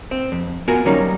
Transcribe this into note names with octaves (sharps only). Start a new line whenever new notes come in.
C4
F2
B3 F4 F#4 A#4 G#5
D3 F#3 G3 A#3 C#4 D#4